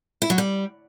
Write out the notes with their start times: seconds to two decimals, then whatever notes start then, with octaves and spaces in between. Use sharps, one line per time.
0.22 E4
0.30 F#3
0.38 G3